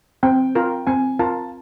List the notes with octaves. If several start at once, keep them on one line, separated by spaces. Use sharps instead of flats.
C4 G5
F4 A#4
C4 G#5
F4 A#4 A5